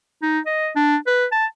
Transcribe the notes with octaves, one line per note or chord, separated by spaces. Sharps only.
D#4
D#5
D4
B4
A5